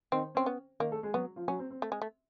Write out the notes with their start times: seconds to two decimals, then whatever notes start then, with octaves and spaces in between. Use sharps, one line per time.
0.12 D#3 C4 D#4
0.35 C4 C#4
0.46 B3
0.80 D#3 A#3 D#4
0.91 A3 A4
1.03 G#3 G#4
1.13 F#3 B3 F#4
1.36 F3 F4
1.48 F#3 C#4 F#4
1.59 C4
1.70 C4
1.82 A3
1.92 G#3
2.02 A3